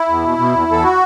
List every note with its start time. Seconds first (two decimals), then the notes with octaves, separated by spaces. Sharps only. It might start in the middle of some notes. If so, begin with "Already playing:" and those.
Already playing: E4
0.09 E2
0.24 B2
0.38 B2
0.54 E2
0.68 E2 A4
0.84 F#4